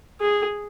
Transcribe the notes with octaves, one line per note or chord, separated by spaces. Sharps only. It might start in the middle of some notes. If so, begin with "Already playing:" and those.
G#4